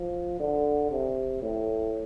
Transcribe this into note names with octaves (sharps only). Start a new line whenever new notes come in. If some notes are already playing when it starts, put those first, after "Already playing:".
Already playing: F3
D3
C3
A2